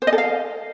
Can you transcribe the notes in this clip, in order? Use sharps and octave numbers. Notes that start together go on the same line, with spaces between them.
C5
D#5
A4
F5